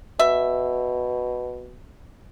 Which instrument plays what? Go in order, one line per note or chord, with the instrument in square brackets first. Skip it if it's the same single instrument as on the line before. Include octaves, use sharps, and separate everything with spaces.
[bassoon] B2 [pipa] E5